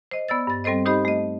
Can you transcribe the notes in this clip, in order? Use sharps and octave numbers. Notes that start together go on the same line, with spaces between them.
C5 D#5
B3 D5 E6 A6
G2 A6
G3 C4 A4 C5 D#5
D#4 G4 C5 D#5 B5
A3 D#5